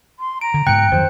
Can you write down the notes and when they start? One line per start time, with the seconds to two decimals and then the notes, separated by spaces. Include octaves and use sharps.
0.19 C6
0.41 A#5 D7
0.54 D3
0.67 G#2 B2 G5 F#6 C#7
0.91 F2 D#3 F#3 C5